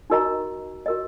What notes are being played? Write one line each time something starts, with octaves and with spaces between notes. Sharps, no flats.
D#4 F#4 A#4 D#5 A#5
F#4 A#4 D#5